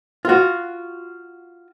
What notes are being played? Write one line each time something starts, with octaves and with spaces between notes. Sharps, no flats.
F4 F#4